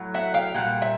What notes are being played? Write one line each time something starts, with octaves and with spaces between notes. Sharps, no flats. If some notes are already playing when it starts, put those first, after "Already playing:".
Already playing: A2 F#3
E5 F#5
F5 G5
A#2 G3 F#5
E5